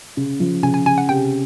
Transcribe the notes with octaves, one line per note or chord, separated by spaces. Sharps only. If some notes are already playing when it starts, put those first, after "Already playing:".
C#3
F3
C#3 G#5
G#5
C#3 G#5
F#5
C3 G5